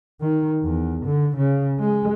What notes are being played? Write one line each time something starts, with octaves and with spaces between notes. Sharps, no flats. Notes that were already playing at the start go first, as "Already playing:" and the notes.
D#3
E2
D3
C#3
G#3